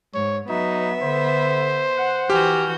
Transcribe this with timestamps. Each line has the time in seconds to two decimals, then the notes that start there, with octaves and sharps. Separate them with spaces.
0.14 G#2 C#5
0.49 F#3 B3 D#4 F#4 E5
1.02 D3 C5
1.97 F#5
2.30 E3 F#4 G4 G#5 F6 G6